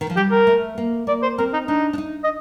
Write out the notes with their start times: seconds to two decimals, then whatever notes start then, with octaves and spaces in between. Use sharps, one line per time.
0.01 D#3
0.10 F3
0.17 G3 G4
0.31 A#4
0.47 A3
0.78 A#3
1.07 A#3 D5
1.23 C5
1.38 C4 A#4
1.53 D#4
1.68 D4 D#4
1.93 D4
1.98 D#4
2.24 D#5